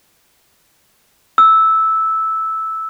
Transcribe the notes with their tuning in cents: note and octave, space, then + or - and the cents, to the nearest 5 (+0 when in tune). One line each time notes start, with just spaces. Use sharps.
E6 -10